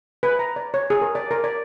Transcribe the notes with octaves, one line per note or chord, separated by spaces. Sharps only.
B4
A#5
D5
C#5
G#4
A#4
D5
A#4
D5